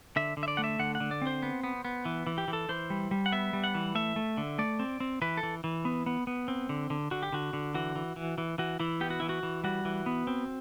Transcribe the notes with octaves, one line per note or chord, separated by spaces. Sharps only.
D3 E5
D3
E5
D5
A3 F#5
E5
D3 F#5
F#5
D3
D5
C4
C5
B3
B3
B3
E3
E3
G4
E3
A4
E3 C5
G3
G3
F#5
B3 E5
G3
F#5
E3
A3 E5
A3
D3
A3 D5
C4
C4
E3 B4
A4
E3
E3
B3
B3
B3
C4
D3
D3
D3 F#4
G4
D3 F#4
D3
E3 F#4
E3
E3
E3
E3 F#4
E3 E4
B3 G4
F#4
E3 E4
F#4
E3
G3 F#4
E3
B3
C4